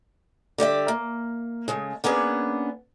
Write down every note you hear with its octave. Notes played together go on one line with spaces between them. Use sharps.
D3 G3 D5 E5
A#3
C#3 G#3 A3
A#3 B3 C#4 D4 G#4